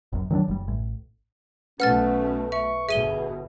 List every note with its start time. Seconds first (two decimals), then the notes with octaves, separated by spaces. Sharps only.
0.13 G1 F#2
0.31 D#3 F#3 C4 D4
0.48 F#1 G3
0.68 A1
1.80 B1 B2 A3 C#4 B4 F#5 F6 A6
2.52 E5 C#6
2.89 G1 B2 G#4 E5 D#7 G7